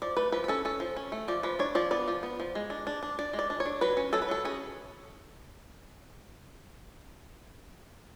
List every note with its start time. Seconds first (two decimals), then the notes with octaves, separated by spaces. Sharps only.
0.02 F3 D5
0.17 A3 B4
0.32 F3 B4
0.44 B4
0.48 C#4 A4
0.65 C#4 A4
0.80 F3
0.96 C#4
1.12 A3
1.28 F3 D5
1.43 F3 B4
1.59 D4 C#5
1.75 F3 D5
1.91 B3 D5
2.08 F3
2.23 B3
2.40 F3
2.55 G#3
2.70 D4
2.87 D4
3.03 D4
3.19 D4 D5
3.33 G#3
3.39 D5
3.50 D4
3.60 C#5
3.66 D4
3.81 F#3 B4
3.97 C#4
4.13 F#3 A4
4.22 B4
4.29 F#3 A4
4.45 C#4 G#4